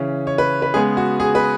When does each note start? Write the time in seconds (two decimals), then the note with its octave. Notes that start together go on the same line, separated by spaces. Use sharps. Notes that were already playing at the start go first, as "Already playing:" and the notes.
Already playing: C#3 E3 C#4
0.27 C#5
0.38 B4
0.62 B4
0.74 C#3 G#3 B3 G#4
0.97 F#4
1.20 G#4
1.35 B4